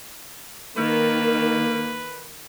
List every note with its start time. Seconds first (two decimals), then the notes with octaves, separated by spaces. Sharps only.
0.78 D#3 A#3 B4